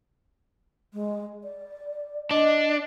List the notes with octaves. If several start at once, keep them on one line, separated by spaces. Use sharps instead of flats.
G#3
D5
D4 D#5